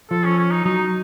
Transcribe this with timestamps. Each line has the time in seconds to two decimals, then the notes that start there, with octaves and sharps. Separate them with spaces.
0.11 F3 A4
0.25 C#4
0.38 C#4
0.51 D#4
0.65 F#3 D#4